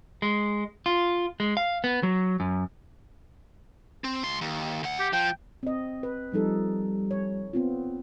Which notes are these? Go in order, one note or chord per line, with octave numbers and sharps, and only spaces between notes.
G#3
F4
G#3
F5
B3
F#3
F#2
C4
C#2 C6
D#2
D2 F#5
G4
F3 G5
C4 D#5
B4
F3 G3 D#4 A4
C#5
B3 C4 F4